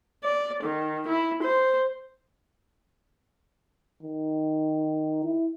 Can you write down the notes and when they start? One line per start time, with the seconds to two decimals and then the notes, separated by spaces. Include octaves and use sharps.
0.24 D5
0.63 D#3
1.08 E4
1.43 C5
4.03 D#3
5.24 E4